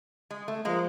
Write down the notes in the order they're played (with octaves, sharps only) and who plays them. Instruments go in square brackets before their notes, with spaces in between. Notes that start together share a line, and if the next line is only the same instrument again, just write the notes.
[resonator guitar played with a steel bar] G#3
A3
[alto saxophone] F3 [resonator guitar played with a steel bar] G#3 A#3